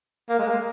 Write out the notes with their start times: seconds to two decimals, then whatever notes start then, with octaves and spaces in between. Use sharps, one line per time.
0.29 A#3
0.39 G#3
0.48 A#3